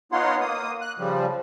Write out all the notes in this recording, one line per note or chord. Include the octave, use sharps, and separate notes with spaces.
B3 D#4 F4 C#5 F#5 C6
A#3 D#6
F#6
C#3 F3 G3